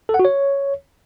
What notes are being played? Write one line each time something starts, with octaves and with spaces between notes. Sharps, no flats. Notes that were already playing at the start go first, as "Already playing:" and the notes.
A4
F#5
F#4
C#5